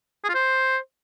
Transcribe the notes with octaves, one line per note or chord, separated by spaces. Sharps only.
G#4
F4
C5